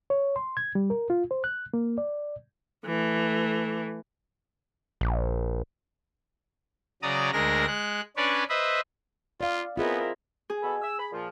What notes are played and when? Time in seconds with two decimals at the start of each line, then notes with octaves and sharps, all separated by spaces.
0.10 C#5
0.36 C6
0.57 G#6
0.75 G3
0.90 A#4
1.10 F4
1.31 C5
1.44 F#6
1.74 A#3
1.98 D5
2.86 E3 A3
5.01 A#1
7.02 C#3 F#3 D5 A#5 D#6
7.33 D2 G#3 D4 A#4 A#6
7.67 G#3 F#6
8.17 C#4 D4 B4 C#5 D5
8.49 B4 C5 D#5 E5
9.41 F4 D5 F5
9.77 B3 C4 E4 F4 G#4 A#4 D#5
10.50 G#4
10.62 B2 A4 B5
10.82 E6
10.99 B5
11.12 A#2 F3